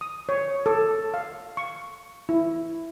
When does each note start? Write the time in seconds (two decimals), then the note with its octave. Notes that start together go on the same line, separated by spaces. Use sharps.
0.01 D#6
0.29 C#5
0.66 A4
1.14 F5
1.57 C#6
2.29 E4